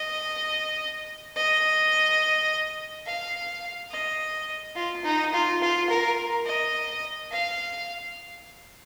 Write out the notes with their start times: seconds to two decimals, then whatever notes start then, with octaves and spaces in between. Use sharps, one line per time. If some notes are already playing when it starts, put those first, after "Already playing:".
Already playing: D#5
1.36 D#5
3.06 F5
3.91 D#5
4.75 F4
5.04 D#4
5.33 F4
5.61 F4
5.89 A#4
6.46 D#5
7.31 F5